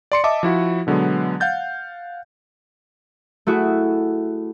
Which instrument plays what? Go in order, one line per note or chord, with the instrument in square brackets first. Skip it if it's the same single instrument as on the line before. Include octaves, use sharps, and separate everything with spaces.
[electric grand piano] D5 C6 C#7
D#5 E5 A5 D6
F3 E4 F#4
B2 D3 F#3 G#3 B3
F5 F#5 G6 A6
[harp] A3 E4 F#4 G#4